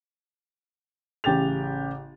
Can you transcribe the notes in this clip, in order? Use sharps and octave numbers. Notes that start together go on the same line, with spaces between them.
A1 C#3 G4 A6 F7